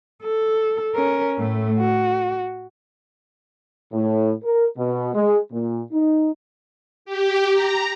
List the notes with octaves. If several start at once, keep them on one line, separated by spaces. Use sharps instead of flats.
A4
C#4 A#4
A2 A3
F#4
A2
A#4
B2
G#3
A#2
D#4
G4
A#5